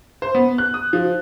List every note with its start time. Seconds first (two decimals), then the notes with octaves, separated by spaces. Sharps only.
0.22 C5
0.35 B3
0.58 F#6
0.74 D#6
0.93 F3